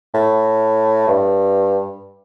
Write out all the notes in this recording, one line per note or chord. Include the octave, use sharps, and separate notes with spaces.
A2
G2